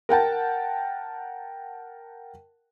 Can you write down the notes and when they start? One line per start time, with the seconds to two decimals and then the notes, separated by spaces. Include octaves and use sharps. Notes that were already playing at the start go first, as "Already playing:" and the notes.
0.09 A#4 F#5 G5 A5